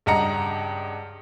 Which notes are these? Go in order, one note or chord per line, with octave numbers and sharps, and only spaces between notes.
C#2 G2 D#5 F#5 A#5 C#7